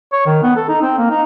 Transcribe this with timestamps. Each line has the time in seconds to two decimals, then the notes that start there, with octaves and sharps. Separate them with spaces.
0.13 C#5
0.26 D#3
0.43 B3
0.57 A4
0.69 D#4
0.82 C4
0.98 A#3
1.10 D#4